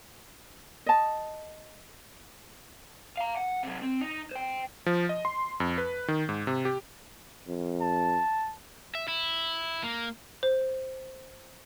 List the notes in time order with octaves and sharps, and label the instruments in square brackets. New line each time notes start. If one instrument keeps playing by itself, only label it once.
[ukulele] D#5 A5
[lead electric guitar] F5 A#5
F#5
C3 F#3
C4
D#4
C5 G5
[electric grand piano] F3
D#5
C6
F2
B4
D#3
G#2
C3
G4
[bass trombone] F2
[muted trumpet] A5
[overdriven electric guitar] E5
E4
A#3
[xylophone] C5